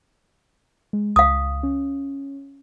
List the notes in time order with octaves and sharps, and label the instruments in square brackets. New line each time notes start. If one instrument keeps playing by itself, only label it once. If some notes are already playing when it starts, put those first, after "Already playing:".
[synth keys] G#3
[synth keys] C#2 [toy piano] F5 D#6
[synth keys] C#4